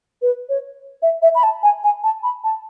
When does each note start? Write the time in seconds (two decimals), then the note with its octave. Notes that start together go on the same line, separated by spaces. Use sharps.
0.22 B4
0.49 C#5
1.02 E5
1.22 E5
1.35 B5
1.43 A5
1.63 G#5
1.84 G#5
2.04 A5
2.23 B5
2.44 A5